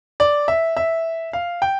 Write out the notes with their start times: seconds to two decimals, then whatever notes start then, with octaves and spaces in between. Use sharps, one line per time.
0.20 D5
0.48 E5
0.77 E5
1.33 F5
1.62 G5